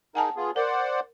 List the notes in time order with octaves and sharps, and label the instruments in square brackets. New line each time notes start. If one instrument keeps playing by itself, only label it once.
[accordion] D#4 G#4 A#4 [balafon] F#5 G#5 A5
[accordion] B3 F4 G#4
[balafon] A#4 [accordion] C5 D5 F#5